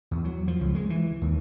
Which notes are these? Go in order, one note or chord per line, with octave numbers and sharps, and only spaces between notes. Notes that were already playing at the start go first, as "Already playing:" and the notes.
E2
F#3
F3
C#2
G#3
E3
D#2